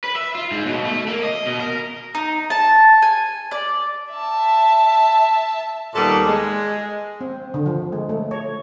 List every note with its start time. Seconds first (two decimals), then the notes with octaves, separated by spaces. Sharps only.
0.04 B4
0.16 E5
0.35 F4
0.51 G#2
0.66 B2
0.85 A3
1.08 A#3
1.23 D#5
1.46 B2
1.60 A#4
2.15 D#4
2.50 A5
3.02 G#5
3.51 D5
4.13 E5 A5
5.94 D#2 A#2 G3 B3 A4
6.25 G#3
7.21 C4
7.54 D3
7.66 F3
7.92 G#3
8.09 A3
8.31 C#5